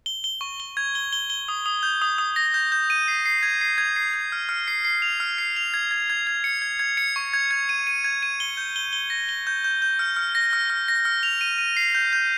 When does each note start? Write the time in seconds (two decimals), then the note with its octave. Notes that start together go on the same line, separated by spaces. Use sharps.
0.06 G7
0.24 G7
0.41 C#6
0.60 G7
0.77 G#6
0.95 G7
1.13 G7
1.30 G7
1.48 D#6
1.66 D#6
1.83 G6
2.02 D#6
2.18 D#6
2.36 A#6
2.54 G6
2.72 G6
2.90 D#7
3.08 C7
3.26 C7
3.43 G#6
3.61 C7
3.78 G#6
3.96 C7
4.14 G#6
4.32 F6
4.49 F6
4.68 C7
4.85 C7
5.02 F7
5.20 F6
5.38 C7
5.56 F7
5.74 G#6
5.91 G#6
6.10 G#6
6.27 G#6
6.44 C#7
6.62 G#6
6.79 G#6
6.97 C#7
7.16 C#6
7.34 G#6
7.51 G#6
7.69 D#7
7.87 D#7
8.04 G#6
8.23 D#7
8.40 G7
8.57 G6
8.76 G7
8.93 G7
9.10 A#6
9.29 G7
9.47 G6
9.64 G6
9.82 G6
9.99 F6
10.17 F6
10.35 A#6
10.53 F6
10.70 F6
10.88 A#6
11.05 F6
11.23 F7
11.41 D#7
11.58 D#7
11.77 C7
11.95 G6
12.13 G6